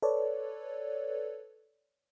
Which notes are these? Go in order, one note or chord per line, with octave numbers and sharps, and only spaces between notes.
A4 B4 C#5 D5